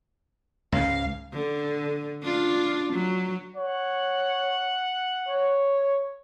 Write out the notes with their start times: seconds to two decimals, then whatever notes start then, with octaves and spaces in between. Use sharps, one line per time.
0.72 C#2 G#2 F5
1.33 D3
2.23 D4 F4
2.93 F#3
3.56 C#5 F#5
5.28 C#5